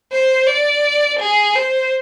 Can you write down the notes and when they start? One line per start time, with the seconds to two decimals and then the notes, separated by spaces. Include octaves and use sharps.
0.12 C5
0.47 D5
1.20 G#4
1.55 C5